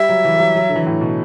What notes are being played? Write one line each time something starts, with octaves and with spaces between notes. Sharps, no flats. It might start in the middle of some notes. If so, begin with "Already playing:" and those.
Already playing: G3 E5
F#3
E3
G3
F#3
F#3
D3
E3
A2
B2